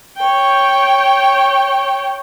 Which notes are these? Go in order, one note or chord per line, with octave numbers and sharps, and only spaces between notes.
C#5 G5